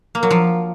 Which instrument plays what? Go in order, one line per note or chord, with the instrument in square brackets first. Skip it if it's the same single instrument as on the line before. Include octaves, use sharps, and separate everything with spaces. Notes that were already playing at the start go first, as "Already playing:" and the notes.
[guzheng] A#3
F#3
F3